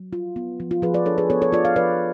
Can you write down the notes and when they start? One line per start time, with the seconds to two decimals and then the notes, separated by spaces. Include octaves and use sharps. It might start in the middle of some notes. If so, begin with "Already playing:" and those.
Already playing: F#3
0.13 F4
0.36 B3
0.60 F3
0.71 F4
0.82 F3 G#4 B4
0.94 B4 D5
1.06 D4 A4 C#5
1.18 G#4 B4
1.30 B3 A4 C#5
1.42 A4 C#5
1.52 F4 D5
1.65 F5
1.76 F3 B4 D5